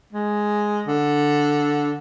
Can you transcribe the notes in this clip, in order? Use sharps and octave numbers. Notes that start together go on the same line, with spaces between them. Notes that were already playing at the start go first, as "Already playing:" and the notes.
G#3
D3